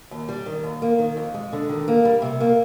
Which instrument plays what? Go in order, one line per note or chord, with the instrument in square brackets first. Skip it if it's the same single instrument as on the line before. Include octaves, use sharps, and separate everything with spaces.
[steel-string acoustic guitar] D#2
G3
D#3
D#2
A#3
D#3
F2
G#3
D3
D#3
A#3
G3
C3
A#3